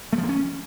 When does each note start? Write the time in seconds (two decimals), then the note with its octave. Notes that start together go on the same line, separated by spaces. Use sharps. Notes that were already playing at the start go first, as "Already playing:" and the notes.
0.13 A3
0.18 F3
0.23 A#3
0.29 C#4